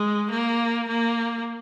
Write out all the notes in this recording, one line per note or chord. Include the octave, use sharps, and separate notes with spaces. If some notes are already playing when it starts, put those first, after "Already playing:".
Already playing: G#3
A#3
A#3